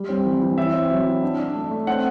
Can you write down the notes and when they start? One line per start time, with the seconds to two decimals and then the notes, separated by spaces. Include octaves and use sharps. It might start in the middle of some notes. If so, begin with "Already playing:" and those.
Already playing: G3
0.09 C4
0.25 E3
0.41 E3
0.58 E4 E5
0.74 C4
0.90 F#3
1.07 E4
1.23 D4
1.39 D4
1.55 A3
1.71 A3
1.87 C4 F#5